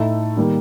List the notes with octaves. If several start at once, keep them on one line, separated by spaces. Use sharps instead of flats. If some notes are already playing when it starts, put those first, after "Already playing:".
Already playing: A2 A3 D#4 A4
D#3 G3 A#3